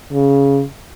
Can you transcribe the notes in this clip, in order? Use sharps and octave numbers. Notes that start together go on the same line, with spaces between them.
C#3